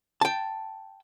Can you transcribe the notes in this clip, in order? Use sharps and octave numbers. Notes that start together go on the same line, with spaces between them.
G5 A5